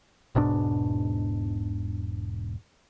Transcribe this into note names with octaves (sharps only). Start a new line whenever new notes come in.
E1 G#2 B2 D4